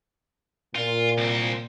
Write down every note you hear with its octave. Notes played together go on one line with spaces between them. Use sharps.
A#2 F4
C2 C4